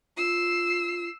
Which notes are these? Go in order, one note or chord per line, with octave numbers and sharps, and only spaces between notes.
F4 E6 C7